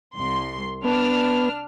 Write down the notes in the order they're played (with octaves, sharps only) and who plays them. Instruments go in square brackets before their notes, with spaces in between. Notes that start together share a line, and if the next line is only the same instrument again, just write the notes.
[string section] C2 C6
[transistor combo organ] B3 [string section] D4 F6